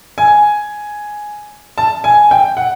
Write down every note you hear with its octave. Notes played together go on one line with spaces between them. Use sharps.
G#5
A5
G#5
G5
F#5